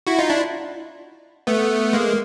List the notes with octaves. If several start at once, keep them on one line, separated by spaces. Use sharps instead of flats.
E4 F#4
D#4 F4
D4 E4
A3 B3
G#3 A#3